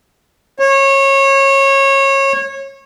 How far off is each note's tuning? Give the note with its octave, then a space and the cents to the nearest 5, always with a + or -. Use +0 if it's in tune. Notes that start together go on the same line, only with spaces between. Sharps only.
C#5 -25